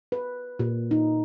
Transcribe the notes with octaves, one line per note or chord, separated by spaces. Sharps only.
B4
A#2
D#4